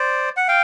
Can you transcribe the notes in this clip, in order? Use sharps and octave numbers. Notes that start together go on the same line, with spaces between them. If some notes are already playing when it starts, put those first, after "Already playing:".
Already playing: C5 D5
F#5
F5 G5